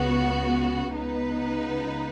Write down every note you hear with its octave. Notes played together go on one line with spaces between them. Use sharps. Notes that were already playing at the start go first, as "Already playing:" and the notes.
Already playing: C#2 C#3 B3 F#4
C#2 C#3 B3 D#4 B4